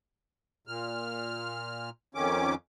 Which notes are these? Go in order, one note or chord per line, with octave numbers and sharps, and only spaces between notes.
A#2 F6
F2 D#3 C#4 D6